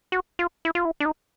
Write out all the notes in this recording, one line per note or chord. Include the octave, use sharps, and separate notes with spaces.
F#4
F4
E4
F4
E4
D4
D#4